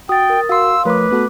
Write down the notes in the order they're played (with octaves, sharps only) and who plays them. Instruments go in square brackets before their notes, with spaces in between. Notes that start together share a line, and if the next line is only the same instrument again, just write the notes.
[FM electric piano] F#4 [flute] G5 [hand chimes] D#6 A6
[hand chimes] A#4
[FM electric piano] F#4 D#6 C7 [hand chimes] F5 C6 [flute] E6
[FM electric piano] F3 A#4 C#5 [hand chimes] A3 D6 [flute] B4
[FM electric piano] B3 F#4 A4